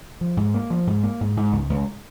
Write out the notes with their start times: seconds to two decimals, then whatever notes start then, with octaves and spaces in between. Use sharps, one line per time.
0.21 F3
0.37 G#2
0.54 A#3
0.70 F3
0.87 G#2
1.03 A#3
1.21 G#2
1.37 G#2
1.52 C#2
1.70 C#2